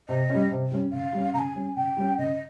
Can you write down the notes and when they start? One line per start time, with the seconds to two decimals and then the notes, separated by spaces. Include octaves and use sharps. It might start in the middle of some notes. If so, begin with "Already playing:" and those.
0.09 C3 D#5
0.30 G3 C#4
0.51 C3
0.72 G3 C#4
0.93 C#3 F5
1.13 G3 C#4
1.34 C#3 A#5
1.39 G#5
1.55 G3 C#4
1.76 C#3 G5
1.97 G3 C#4
2.18 C#3 D#5